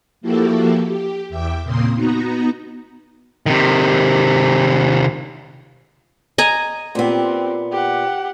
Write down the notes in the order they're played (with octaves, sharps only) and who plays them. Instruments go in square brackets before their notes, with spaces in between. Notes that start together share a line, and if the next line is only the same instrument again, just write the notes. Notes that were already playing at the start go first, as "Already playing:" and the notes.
[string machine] F3 A#3 E4 F#4 G4 A4
G4
E2 E5 G5 D6
A#2 C#3 A#3 C4 C6 D#6
B3 D#4 F#4 A#5
[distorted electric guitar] C3 D#3
[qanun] D#5 G#5 A#5
[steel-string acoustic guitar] A#2 B3 [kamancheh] C4 G4
[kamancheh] G4 F#5